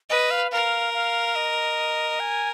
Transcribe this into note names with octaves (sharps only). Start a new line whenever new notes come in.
B4 D#5
F5
A#4 F5
F5
D#5
G#5